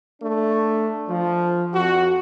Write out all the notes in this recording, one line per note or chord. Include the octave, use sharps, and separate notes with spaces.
A3 D4
F3
F2 F#4